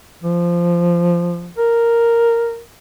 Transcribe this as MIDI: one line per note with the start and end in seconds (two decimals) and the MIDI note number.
0.24 1.52 53
1.58 2.61 70